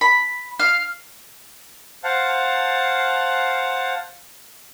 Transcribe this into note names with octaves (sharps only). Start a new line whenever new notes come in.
B5
F5
C5 F5 F#5 A5